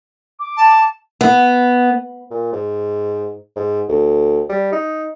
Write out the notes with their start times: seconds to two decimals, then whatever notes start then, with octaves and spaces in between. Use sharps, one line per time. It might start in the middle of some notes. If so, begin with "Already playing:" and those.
0.39 D6
0.57 A5
1.21 B3
2.31 A#2
2.53 G#2
3.56 G#2
3.88 D2
4.49 G3
4.72 D#4